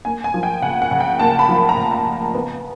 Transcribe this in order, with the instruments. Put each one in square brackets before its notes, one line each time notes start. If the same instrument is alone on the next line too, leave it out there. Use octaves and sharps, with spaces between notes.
[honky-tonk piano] A#3 G#5
G#5
F3
G5
C#3 F#5
F#5
C#3
G5
A#3 A5
B5
F3
B5
A#5
C#3 A5
A#5
C#3
B3